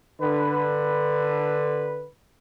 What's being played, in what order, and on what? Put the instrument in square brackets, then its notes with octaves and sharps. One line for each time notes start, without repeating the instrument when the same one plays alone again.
[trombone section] D3 B4